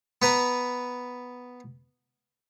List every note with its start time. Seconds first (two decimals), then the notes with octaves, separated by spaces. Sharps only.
0.22 B3 B4 A#5